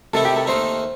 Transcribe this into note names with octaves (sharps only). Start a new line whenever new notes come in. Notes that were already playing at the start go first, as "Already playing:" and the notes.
C3 D#3 A3 E4 A4
G4
A4
D#2 D#3 A3 D#4 C5